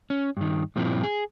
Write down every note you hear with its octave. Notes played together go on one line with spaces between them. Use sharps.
C#4
G2 D#3
G2 A#2 F3 C4 E4
G#4